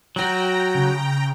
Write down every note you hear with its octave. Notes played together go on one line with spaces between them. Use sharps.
F#3 F#4 G5 A#5
C#3